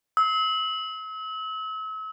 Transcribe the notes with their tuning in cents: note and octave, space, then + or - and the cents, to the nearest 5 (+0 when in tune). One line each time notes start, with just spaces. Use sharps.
E6 -40